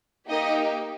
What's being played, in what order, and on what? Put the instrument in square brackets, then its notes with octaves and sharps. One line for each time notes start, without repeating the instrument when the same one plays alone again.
[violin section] A#3 D#4 G4 D#5